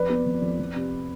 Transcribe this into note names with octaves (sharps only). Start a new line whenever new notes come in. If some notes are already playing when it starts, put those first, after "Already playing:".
Already playing: F2 B4 D5
B3
F2
F2
F2
C3